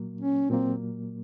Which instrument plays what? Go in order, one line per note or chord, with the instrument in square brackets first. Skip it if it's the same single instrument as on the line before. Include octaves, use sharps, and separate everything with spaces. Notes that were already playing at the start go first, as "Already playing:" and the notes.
Already playing: [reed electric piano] A#2 F#3 A#3
[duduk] C#4
[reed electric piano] A#2 F#3 A#3 [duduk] C4